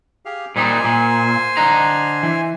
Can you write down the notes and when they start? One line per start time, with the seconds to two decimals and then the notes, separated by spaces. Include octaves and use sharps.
0.25 G4 G#4 F5
0.56 A#2 G3 D#4 C5 G#5
0.85 A#2
1.57 D3 D#5 A#5
2.23 E3